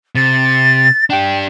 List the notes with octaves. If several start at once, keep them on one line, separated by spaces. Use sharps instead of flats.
C3 A6
D4 G4 G5